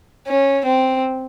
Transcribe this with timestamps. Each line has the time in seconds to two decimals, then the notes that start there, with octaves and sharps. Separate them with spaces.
0.27 C#4
0.65 C4